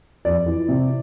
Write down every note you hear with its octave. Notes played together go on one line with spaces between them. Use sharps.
F2 D5
E3
C3